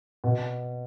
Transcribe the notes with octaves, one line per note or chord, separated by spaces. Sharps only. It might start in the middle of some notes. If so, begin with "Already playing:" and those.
B2